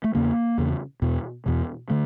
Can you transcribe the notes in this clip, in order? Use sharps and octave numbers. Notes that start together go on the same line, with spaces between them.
A3
E2 C#3 A#3
E2 C#3
E2 B2
E2 B2
D3 A3